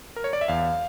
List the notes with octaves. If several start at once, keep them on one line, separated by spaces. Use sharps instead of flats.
A#4
C#5
D5
E5
E2 F5